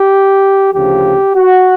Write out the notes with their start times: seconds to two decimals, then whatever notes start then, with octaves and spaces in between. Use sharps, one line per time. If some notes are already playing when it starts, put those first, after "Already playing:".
Already playing: G4
0.74 D2 C#3 F3 G4
1.35 F#4